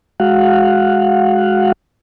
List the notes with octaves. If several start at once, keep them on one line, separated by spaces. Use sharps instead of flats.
G#3 F#4 F5 F#5